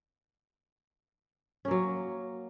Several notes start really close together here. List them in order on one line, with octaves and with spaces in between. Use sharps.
C#4 A#3 F#3